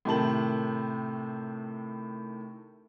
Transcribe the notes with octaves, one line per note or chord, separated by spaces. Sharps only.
A2 C3 D#3 A5 F#7